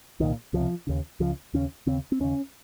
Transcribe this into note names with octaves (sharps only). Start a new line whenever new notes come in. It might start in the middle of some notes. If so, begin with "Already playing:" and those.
C2 A#2 D#3
C#2 C3 F3
D#2 C#3
C#2 C#3 F3
D#2 C#3 C#4
D#2 C#3 C4
C4
D#2 C#3 C#4